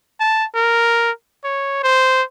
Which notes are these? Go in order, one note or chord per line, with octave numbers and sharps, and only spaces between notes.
A5
A#4
C#5
C5